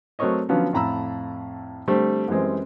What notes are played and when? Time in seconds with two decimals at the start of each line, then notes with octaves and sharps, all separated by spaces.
0.19 F#3 A3 C4 A#4 C#5 D#5
0.49 D3 F3 F#3 B3 C#4
0.73 F2 A2 A#5 B5 E6
1.88 D3 G3 A3 C4 C5
2.28 F#2 E3 G3 G#3 C4